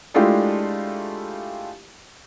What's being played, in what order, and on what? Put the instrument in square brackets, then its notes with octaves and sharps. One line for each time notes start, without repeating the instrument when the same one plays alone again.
[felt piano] G#3 A3 D4 E4 F4 G4